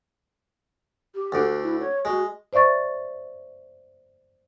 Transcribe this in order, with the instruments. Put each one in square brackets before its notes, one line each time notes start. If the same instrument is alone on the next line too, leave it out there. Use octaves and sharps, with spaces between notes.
[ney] G4
[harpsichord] D2 D3
[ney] E4
C#5
[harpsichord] G#3 [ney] F#4
[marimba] C5 D5 E5 C#6 A6